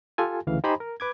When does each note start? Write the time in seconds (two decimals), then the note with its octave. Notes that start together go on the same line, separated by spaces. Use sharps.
0.18 F4 G4 A4 G#5
0.47 D2 C#3 E3 F5
0.64 D#4 G4 C5 G#5 A#5 B5
0.80 A#4
1.00 B4 D6 G#6